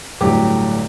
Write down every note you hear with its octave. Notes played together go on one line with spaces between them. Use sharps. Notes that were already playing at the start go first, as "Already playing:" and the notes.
D1 G1 A2 F#3 G4 D6